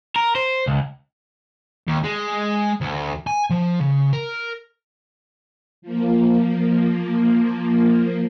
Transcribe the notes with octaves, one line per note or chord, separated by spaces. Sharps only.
A#4
C5
C#2
D#2
G#3
D2
G#5
F3
C#3
A#4
F3 A#3